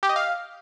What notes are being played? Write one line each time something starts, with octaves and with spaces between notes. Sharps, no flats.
G4
D#5
F5